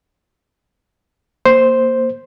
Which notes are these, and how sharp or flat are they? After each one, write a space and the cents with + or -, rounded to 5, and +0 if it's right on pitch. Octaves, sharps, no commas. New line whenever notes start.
A#3 +0 C5 +0